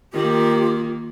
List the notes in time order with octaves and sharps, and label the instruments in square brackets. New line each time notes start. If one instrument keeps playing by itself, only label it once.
[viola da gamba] D#3 A#3 [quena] F4 [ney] G4